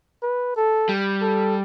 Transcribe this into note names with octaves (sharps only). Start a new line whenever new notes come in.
B4
A4
G3
A4